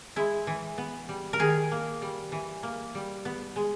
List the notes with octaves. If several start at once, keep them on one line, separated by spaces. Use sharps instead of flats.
G#3 E4
E3
B3
G3
A#4
D#3 G#4
A#3
G3
E3
A#3
G3
B3
G#3